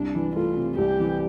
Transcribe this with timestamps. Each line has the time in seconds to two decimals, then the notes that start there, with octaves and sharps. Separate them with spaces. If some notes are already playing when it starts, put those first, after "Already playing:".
Already playing: C2 D4
0.15 E3
0.35 A3 F4
0.56 C3
0.78 C2 G4
1.00 E3